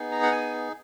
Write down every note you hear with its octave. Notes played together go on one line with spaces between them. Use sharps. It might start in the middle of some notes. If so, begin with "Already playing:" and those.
Already playing: B3 D#4 G#4
A#5
F#5
G#5